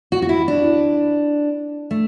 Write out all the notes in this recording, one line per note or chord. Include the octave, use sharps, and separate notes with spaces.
F#4
F#4
E4
D4
A3